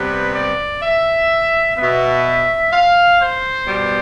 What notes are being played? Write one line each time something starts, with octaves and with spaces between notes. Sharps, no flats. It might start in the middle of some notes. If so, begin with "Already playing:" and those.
Already playing: C3 G3 B3 B4
D5
E5
B2 B3 E5
F5
C5
B2 G3 B3